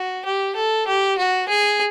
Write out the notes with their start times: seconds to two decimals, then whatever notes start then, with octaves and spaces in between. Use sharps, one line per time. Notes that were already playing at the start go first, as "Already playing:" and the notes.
Already playing: F#4
0.25 G4
0.56 A4
0.87 G4
1.18 F#4
1.49 G#4